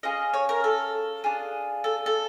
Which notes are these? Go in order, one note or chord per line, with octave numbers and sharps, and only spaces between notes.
C#4 F4 G#4 D#5
C#5
A#4
A4
D4 F4 G#4
A4
A4